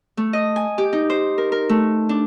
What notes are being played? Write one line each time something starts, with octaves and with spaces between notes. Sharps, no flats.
A3
D#5
G#5
G4
D#4
C5
A#4
A#4
A3
D4